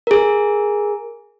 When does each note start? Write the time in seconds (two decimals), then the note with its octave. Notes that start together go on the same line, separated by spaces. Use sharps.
0.07 G#4 A#4